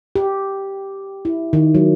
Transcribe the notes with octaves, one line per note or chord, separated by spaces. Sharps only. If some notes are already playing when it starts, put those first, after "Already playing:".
G4
E4
D#3
F#3